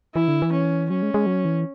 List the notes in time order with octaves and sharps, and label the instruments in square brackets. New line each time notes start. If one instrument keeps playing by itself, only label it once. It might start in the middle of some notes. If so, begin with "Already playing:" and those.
[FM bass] E3 [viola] E4
[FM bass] D3
E3
[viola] C#4
[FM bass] F#3 [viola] C#4
[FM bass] G#3
G#3
F#3
E3